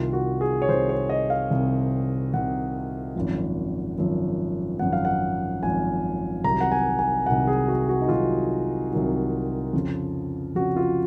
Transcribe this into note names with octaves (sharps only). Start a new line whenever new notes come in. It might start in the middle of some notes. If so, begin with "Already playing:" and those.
Already playing: C2 C3 D#3 F4
F#4
G#4
C#5
C2 C3 D#3 C5
C#5
D#5
F5
C2 C3 D#3
C2 C3 D#3 F#5
G#1 F#2 F3
G#1 F#2 F3
G#1 F#2 F3 F#5
F5
F#5
G#1 F#2 F3 G#5
C2 C3 D#3 F#3 A#5
F#5
G#5
G#5
C2 C3 D#3 F#3 F#5
G#4
F#4
F#4
D#4
C2 C3 D#3 F#3 F4
C2 C3 D#3 F#3
F2 C#3 F3
F2 C#3 F3 F#4
F4